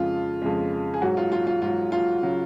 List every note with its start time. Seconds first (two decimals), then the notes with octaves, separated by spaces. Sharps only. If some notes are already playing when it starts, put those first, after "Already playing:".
Already playing: F2 C#3 G#3 F4
0.42 F2 C#3 G#3
0.94 G#4
1.02 G#2 F#3 F#4
1.17 F4
1.32 F4
1.47 F4
1.62 G#2 F#3 F4
1.92 F4
2.22 C#3 F#3